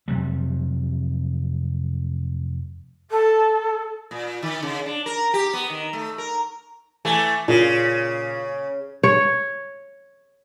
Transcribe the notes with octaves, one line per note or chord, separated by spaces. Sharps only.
F2 C3 F#3 G3
A4
A#2
D#3
C#3
D4
A#4
G4
B3
D#3
A3
A#4
E3 A3 G#5
A#2 C#3
C#5